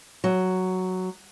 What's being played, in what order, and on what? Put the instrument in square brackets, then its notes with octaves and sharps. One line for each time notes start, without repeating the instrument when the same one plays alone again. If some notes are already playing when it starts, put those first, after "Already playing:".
[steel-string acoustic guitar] F#3